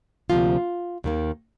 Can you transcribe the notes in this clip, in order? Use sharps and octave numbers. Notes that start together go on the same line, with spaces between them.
D2 C3 F3 A#3 F4
D#2 D#3 A#3